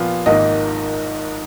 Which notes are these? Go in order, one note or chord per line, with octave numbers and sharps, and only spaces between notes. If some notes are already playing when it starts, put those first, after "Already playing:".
Already playing: A#2 F3 B3 F4
G#1 G#2 D#3 A#3 D#4 D#5